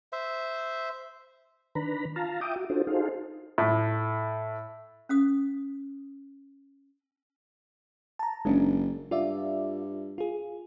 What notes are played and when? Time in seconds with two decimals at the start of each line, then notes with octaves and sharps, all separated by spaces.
0.13 C5 E5
1.75 D#3 D4 B4 A#5 B5
2.16 F4 F5 A5 A#5
2.41 E5 G5 D6 D#6
2.56 F#4
2.70 D4 F4 F#4 A4 C5
2.87 D#4 F#4 G#4 A4 C5 F5
3.58 A2
5.09 C#4 F5 D#6
8.19 A5 A#5
8.45 F#1 G#3 C#4 D4
9.11 G2 F4 D5 E5
10.18 F4 G#4